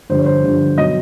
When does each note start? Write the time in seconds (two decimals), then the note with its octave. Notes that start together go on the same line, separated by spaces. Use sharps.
0.09 G2 D3 F3 C5
0.18 C#5
0.26 C5
0.44 G2 D3 F3
0.78 B2 F#3 D#5